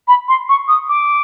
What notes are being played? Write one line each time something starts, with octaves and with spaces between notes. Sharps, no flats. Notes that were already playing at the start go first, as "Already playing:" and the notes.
B5
C6
C#6
D#6
D6